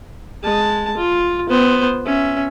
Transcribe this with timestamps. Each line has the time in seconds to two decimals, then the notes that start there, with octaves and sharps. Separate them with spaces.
0.43 G#3 A5
0.97 F4
1.49 B3 C5
2.06 C#4 E5